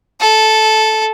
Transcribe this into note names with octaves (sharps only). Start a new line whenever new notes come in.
A4